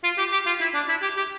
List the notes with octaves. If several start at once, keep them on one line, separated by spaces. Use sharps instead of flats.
F4
G4
G4
F4
E4
D4
E4
G4
G4